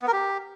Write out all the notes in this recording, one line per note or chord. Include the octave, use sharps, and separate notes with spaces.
B3
A#4
G4